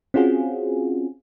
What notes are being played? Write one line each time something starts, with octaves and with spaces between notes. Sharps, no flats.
C4 C#4 F4 F#4 G#4